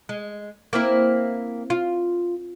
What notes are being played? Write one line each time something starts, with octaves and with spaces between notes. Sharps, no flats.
G#3
A#3 C4 E4
F4